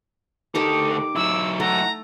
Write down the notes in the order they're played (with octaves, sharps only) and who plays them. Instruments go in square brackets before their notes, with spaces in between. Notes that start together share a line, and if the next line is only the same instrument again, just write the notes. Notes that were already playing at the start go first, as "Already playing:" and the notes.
[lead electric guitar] D2 A4 [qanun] D#4 G4 A#4 [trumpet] D6
[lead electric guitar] F#3 E4 [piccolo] E6
[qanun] A3 [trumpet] F#5 [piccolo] A#5